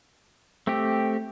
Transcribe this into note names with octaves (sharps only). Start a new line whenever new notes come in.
A3 C4 G4